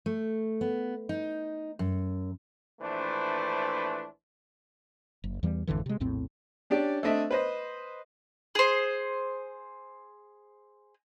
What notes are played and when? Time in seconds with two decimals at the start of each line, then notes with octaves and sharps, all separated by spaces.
0.06 A3
0.61 B3
1.09 D#4
1.79 F#2
2.81 A#1 E3 A3 D4 B4 C5
5.24 F#1
5.43 E2 E3 G3
5.67 G#1 F2 D3 E3
5.86 C3 G#3
6.00 A#1 E2 A2 C4
6.70 C#4 D4 G4 D5
7.03 A3 C4 D4 D#5 E5
7.31 B4 C5 D#5
8.55 G#4 C5